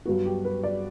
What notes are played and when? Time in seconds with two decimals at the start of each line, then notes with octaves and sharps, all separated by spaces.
0.05 G2 F#3 B3 F#4
0.26 G4
0.45 B4
0.63 D5